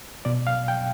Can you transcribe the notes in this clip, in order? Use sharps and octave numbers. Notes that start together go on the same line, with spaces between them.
B2 D5
F5
G5